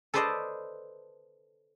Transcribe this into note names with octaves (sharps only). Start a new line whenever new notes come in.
A4 B4 C5 D5 D#5 A5